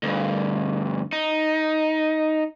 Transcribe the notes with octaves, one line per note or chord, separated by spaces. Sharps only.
D2 G2
D#4